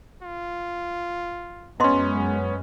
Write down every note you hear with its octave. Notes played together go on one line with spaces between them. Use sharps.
F4
F#2 G#3 B3 C#4 E4 D#5 C6